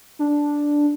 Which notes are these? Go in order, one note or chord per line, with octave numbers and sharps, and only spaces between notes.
D4